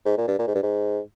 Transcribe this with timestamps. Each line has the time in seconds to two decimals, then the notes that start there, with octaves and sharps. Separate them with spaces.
0.06 G#2
0.17 A#2
0.28 G2
0.39 A#2
0.47 G#2
0.55 G2
0.63 G#2